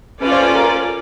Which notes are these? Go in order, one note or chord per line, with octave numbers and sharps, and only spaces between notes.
C#4 F4 A4 B4 D5
C5
B4
A#4